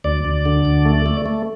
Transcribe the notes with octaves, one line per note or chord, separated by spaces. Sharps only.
D2 D5
D2
D3
D2
A3
A3
A3